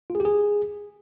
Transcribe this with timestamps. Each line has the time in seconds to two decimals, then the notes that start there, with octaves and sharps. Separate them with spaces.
0.10 F4
0.15 G#4
0.20 G4
0.25 G#4